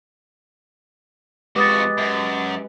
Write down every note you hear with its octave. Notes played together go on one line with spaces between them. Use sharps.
F2 G#3 F#4 G4 B4 D6 D#6 A6
F#2